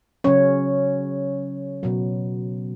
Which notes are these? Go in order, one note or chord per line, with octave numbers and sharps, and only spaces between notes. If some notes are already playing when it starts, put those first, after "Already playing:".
C#3 F#3 C#4 C#5
B2 F#3